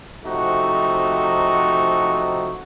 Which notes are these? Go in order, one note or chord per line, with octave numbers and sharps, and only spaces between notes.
C3 F3 A3 D#4 F#4